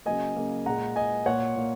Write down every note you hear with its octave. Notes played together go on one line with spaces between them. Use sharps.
C#3 F#3 A#3 D#5 G#5
C#3 F#3 A#3
A#2 G#3 F#5 A#5
A#2 G#3 D#5 G#5
A#2 A#3 C#5 F#5
A#2 A#3